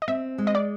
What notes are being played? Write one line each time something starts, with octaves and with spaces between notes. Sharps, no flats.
D#5
C4 E5
G#3
D#5
D5